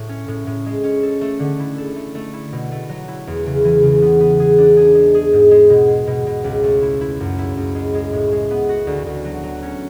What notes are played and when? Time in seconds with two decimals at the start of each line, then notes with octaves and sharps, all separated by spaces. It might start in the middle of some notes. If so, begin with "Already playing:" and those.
Already playing: A2
0.09 C#4
0.28 A2
0.47 A2
0.66 G#3
0.84 C#4
1.03 A4
1.21 A3
1.40 D3
1.59 E4
1.78 A4
1.96 A3
2.15 A3
2.34 E4
2.52 B2
2.72 A3
2.89 F#3
3.08 E4
3.27 E2
3.46 C#3
3.65 E3
3.83 C#3
4.02 B3
4.20 B3
4.40 G#4
4.58 D4
4.77 G#4
4.95 G#3
5.14 G#4
5.33 G#2
5.51 G#3
5.70 B2
5.88 G#3
6.07 B2
6.27 B2
6.44 C#2
6.63 A3
6.82 E4
7.01 E4
7.20 F#2
7.38 E4
7.56 F#2
7.75 G#3
7.95 G#3
8.13 A2
8.32 G#3
8.51 B3
8.69 F#4
8.87 D2
9.06 D2
9.25 F#3
9.43 F#3
9.62 C#4